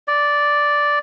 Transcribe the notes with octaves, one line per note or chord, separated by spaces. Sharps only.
D5